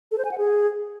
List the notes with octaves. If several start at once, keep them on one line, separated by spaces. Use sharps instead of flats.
A4
C5
G#5
F#5
G#4